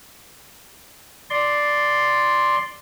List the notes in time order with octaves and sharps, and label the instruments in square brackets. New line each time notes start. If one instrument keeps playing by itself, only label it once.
[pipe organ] D5 C6